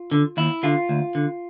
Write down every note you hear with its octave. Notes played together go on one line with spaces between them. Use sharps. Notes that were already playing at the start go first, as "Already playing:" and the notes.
Already playing: F4
D3
D#2 E4
D3 F4
D2
D3